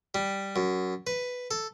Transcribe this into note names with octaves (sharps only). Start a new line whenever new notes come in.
G3
F#2
B4
A4